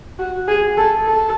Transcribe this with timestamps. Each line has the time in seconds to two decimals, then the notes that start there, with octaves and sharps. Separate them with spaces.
0.19 F#4
0.48 G#4
0.77 A4
1.06 A4